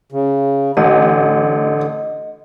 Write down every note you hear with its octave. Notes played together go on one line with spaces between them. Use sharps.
C#3
A1 D3 D#5